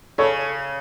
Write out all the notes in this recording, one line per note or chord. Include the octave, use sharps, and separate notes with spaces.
C#3 A4 C#5